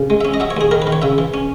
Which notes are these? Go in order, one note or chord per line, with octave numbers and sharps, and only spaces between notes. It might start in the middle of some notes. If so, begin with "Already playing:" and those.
Already playing: C#3
G#3
C#4 E5
D#5
F#3 E5
C#5
D#2 G#4
D#3 A#4
B4
D#3
C#5
C#3 E5
E3
C#4